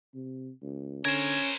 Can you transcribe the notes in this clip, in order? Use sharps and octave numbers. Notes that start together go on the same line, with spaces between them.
C3
C#2
D3 C#4 A#4 C5 G#6